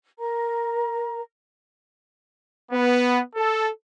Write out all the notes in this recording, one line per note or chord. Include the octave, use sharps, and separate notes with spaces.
A#4 A#5
B3
A4